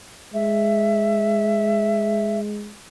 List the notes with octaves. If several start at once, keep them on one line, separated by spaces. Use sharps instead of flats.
G#3 E5